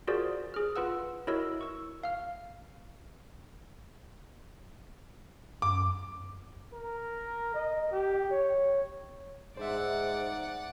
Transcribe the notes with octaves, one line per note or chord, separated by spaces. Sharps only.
F4 F#4 G#4 A#4 C5 D5
G#4 F6
F4 B4 F#5 E6
E4 F#4 A#4 C#5 D#5 E6
C#6 E6
F5 F6
F#2 D6
A#4
D#5
G4
C#5
G#2 C5 D5 E5 F#5